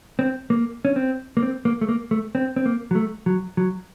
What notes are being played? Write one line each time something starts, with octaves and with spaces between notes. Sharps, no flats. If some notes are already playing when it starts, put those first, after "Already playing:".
C4
A#3
C#4
C4
A#3
C4
A#3
A3
A#3
A3
C4
C4
A#3
F#3
A3
F#3
F#3